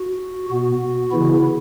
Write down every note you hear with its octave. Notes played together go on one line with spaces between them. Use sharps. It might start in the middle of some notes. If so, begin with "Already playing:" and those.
Already playing: F#4
B2 B3 F#4
C#3 E3 B3 E4